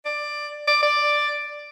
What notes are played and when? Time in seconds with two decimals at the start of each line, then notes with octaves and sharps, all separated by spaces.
0.05 D5
0.67 D5
0.83 D5